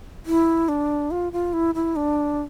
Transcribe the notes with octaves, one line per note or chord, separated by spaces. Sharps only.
E4
D4
F4
F4
E4
E4
D4